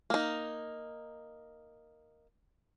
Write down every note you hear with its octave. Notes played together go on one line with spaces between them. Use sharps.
A#3 D#4